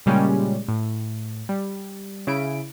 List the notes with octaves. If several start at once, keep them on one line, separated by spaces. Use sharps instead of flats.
A#2 C#3 G3 G#3 C#4 G4
A2
G3
C#3 E4 D7